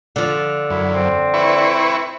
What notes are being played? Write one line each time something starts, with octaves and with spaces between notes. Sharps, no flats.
D3 F3
F#2 E4
C4
E4 B4 C#6